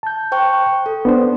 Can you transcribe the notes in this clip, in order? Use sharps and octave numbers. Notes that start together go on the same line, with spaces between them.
A5 G6
C5 G5 C#6
A4
B3 D4 C5